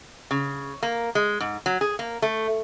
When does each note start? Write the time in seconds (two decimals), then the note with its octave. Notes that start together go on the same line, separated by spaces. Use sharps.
0.31 C#3
0.83 A#3
1.15 G#3
1.40 G#2
1.66 F#3
1.81 G#4
1.99 A#3
2.22 A3